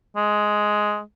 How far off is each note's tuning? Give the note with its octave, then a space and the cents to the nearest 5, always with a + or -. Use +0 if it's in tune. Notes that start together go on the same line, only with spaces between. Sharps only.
G#3 +10